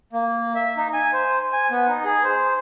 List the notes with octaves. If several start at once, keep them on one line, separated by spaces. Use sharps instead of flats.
A#3
E5
D#4
G#5
C5
G#5
B3
D#4
G#4
C5